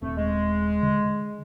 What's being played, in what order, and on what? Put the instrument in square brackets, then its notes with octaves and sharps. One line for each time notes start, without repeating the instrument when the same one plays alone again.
[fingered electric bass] D#1 C4 [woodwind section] A3
[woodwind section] G#3
[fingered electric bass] D3